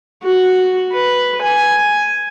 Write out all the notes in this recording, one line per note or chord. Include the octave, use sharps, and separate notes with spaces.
F#4
B4
G#5